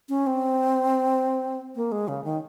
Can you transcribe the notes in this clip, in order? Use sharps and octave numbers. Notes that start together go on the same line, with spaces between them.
C#4
C4
A#3
G#3
C#3
D#3